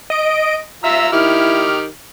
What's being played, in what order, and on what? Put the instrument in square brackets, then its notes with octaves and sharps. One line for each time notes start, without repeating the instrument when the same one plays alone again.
[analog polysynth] D#5 D7
[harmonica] F4 A#5 E6 [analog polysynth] E5
[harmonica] D#3 G4 [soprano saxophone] E4 [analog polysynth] F6